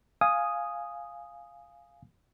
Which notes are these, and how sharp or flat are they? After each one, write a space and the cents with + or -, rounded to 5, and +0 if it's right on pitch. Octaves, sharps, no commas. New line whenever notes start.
F5 +0 G#5 +0 D#6 +0